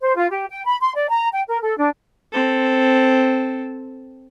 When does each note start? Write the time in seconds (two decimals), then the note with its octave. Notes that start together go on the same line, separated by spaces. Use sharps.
0.02 C5
0.16 F4
0.29 G4
0.50 G5
0.66 B5
0.81 C6
0.95 D5
1.09 A#5
1.33 G5
1.48 A#4
1.62 A4
1.77 D4
2.33 C4 A4